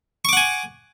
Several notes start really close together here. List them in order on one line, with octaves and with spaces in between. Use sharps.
C#6 D6 F#5 G#5